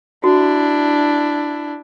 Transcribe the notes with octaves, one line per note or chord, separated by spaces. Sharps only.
D4 E4 F#4